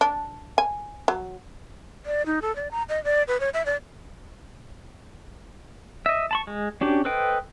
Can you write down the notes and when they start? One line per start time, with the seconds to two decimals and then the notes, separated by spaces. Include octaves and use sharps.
0.01 D4
0.58 G#5
1.08 F#3
2.06 D5
2.26 D#4
2.42 A4
2.56 D5
2.71 A#5
2.89 D#5
3.04 D5
3.28 B4
3.40 C#5
3.54 E5
3.66 D5
6.06 D#5 E5
6.31 A5 B5 C#6
6.47 G#3
6.81 C#4 D4 F#4 G4
7.05 A4 B4 C5 D#5 G5